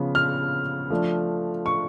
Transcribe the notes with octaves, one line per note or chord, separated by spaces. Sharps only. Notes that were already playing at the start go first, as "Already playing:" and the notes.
Already playing: C#3 F3 B3
F6
F3 A3 D4
C#6